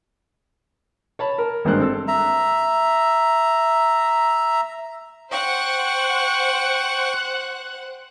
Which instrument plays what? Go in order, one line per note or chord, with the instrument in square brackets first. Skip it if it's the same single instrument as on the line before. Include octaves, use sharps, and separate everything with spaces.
[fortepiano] C#5 A5 B5
A#4
G#1 G2 A#4 C5 F#6
C4 A4
[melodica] E5 A#5
[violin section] C5 F#5 [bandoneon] G5 C#6